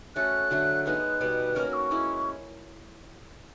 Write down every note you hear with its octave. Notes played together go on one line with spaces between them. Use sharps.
A3 C#4 F#4 A4 F#6
D3 F#3 A3
G#3 B3 D#4 F#6
B2 G3 B3
A#3 C#4 F#4 A#4 F6
C#6
G#3 C#4 E4